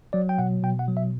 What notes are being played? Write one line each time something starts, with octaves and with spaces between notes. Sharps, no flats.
F#3 D5
G5
B2 F#5
B2 G5
F#5
F#3
E5